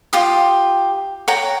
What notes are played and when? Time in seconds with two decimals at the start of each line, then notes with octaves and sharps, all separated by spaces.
0.13 F4 G4 D#6
1.28 C#5 F#5 G5 A#5